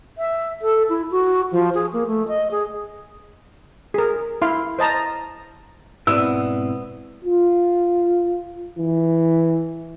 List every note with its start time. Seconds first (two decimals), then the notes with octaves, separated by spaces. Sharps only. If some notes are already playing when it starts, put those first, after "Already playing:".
0.18 E5
0.62 A4
0.89 E4
1.11 F#4
1.52 F3
1.75 G#4
1.93 A#3
2.07 A3
2.28 D#5
2.51 G#4
3.94 G#4 A#4
4.42 E4 F5 C6
4.79 C5 D#5 A5 A#5
6.07 G#2 B2 B3 C4 E4 D5 E6
7.25 F4
8.78 E3